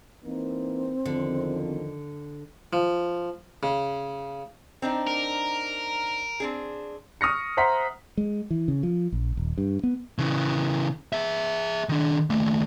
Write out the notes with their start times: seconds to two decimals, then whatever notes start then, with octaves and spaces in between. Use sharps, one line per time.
0.25 E3 A#3 C4 D#4
1.06 E2 D3 D#3 F3
2.73 F3
3.63 C#3
4.82 C4 D4 D#4
5.07 A#4
6.40 C4 D4 G#4
7.21 C#6 D#6 F6 A#6 C#7
7.57 C5 E5 F#5 A#5 C6 B6
8.17 G#3
8.51 E3
8.68 C#3
8.83 F3
9.12 A#1
9.37 D#1
9.58 G2
9.83 B3
10.19 C#3 E3
11.13 G#4 E5
11.89 D#3 D4
12.30 D#2 A3